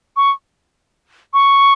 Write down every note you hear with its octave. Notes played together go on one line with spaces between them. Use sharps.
C#6
C#6